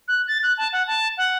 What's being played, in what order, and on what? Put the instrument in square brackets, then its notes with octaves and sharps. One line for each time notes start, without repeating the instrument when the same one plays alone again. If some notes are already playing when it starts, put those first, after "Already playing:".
[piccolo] F#6
A6
F#6
A5
F#5
A5
F#5